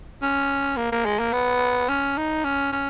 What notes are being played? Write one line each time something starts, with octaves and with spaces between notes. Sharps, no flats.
C#4
A#3
A#3
G#3
A#3
B3
C#4
D#4
C#4
C#4